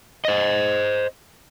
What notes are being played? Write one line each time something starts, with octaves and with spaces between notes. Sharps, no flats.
C5 D#5